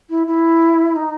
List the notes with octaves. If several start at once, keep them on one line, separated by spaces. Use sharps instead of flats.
E4
E4
D#4